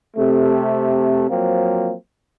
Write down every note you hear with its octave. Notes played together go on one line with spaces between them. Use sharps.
C3 A3
F3 F#3 A#3 C4